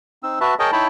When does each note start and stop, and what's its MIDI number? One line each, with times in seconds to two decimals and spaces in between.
0.23 0.39 60
0.23 0.39 63
0.23 0.39 88
0.41 0.54 66
0.41 0.54 71
0.41 0.54 76
0.41 0.54 81
0.59 0.71 68
0.59 0.71 70
0.59 0.71 73
0.59 0.71 75
0.59 0.71 79
0.59 0.71 81
0.72 0.88 63
0.72 0.88 64
0.72 0.88 73
0.72 0.88 79
0.72 0.88 81
0.72 0.88 83